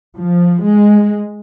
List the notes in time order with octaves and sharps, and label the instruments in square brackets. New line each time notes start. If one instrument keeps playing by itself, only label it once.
[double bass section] F3
G#3